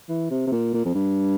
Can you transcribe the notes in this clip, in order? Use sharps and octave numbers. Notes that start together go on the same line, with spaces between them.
E3
C3
C3
A#2
A#2
F2
G2